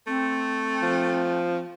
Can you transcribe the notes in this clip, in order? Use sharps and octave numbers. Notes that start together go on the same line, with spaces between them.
A3 C4
F3